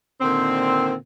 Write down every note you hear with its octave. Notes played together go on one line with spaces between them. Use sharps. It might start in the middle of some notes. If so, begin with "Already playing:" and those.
A#2 D3 D#3 C4